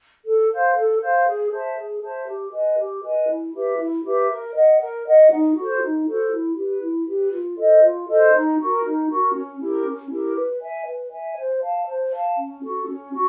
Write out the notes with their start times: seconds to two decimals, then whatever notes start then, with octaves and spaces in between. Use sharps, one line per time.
0.25 A4
0.50 C5 F5
0.75 A4
1.00 C5 F5
1.26 G#4
1.51 C5 E5 A5
1.76 G#4
2.01 C5 E5 A5
2.27 G4
2.52 B4 D#5 G#5
2.77 G4
3.02 B4 D#5 G#5
3.28 E4
3.53 G4 B4 E5
3.78 E4
4.03 G4 B4 E5
4.28 A#4
4.54 D#5 F#5
4.79 A#4
5.05 D#5 F#5
5.30 D#4
5.55 F#4 A4 C5
5.80 D#4
6.05 F#4 A4 C5
6.31 E4
6.56 G4 B4
6.81 E4
7.07 G4 B4
7.32 F4
7.56 A4 C5 D#5
7.82 F4
8.07 A4 C5 D#5
8.33 D#4
8.58 F#4 A#4
8.83 D#4
9.08 F#4 A#4
9.34 C#4
9.58 E4 G4 A#4
9.84 C#4
10.09 E4 G4 A#4
10.35 B4
10.60 E5 G#5
10.85 B4
11.10 E5 G#5
11.36 C5
11.61 F5 A5
11.86 C5
12.12 F5 A5
12.36 C#4
12.62 F#4 A4
12.87 C#4
13.12 F#4